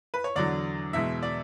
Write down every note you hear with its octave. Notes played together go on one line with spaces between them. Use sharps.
B4
C#5
E2 D3 F#3 D5
E2 B2 G#3 E5
D5